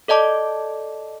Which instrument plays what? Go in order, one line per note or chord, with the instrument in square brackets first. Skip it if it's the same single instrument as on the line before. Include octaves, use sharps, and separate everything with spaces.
[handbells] A4 D5 D#5 A5 D6